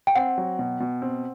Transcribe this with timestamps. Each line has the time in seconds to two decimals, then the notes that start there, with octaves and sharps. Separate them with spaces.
0.07 G5
0.16 C4 F#5
0.38 F#3
0.59 B2
0.80 B2
1.02 C4